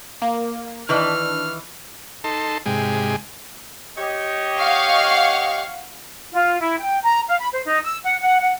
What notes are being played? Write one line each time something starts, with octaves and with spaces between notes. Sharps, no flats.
A#3
D#3 E3 D4 B4 F6
D#4 A4 A5 C6
G#2 C3 G#3 G4 G#5
G4 C#5 D#5
F5 F#5 C#6
F4
E4
G5
A#5
F5
B5
C5
D#4
E6
F#5
F#5
F#5